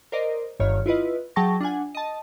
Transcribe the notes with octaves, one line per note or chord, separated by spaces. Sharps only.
A#4 C5 D5 D#5
G1 G2 D#3 C#5 F6
E4 F4 B4 D#5
F#3 G#4 G5 A5 C#6 A#6
D4 F4 F#5 G#5
D#5 A5